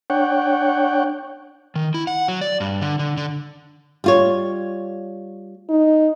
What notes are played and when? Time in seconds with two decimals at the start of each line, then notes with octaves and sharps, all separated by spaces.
0.10 D4 C#5 F#5 G5
1.76 D#3
1.94 E4
2.07 F#5
2.28 F#3
2.41 D5
2.60 G2
2.81 D3
2.99 D3
3.17 D3
4.04 G3 F4 C#5
5.69 D#4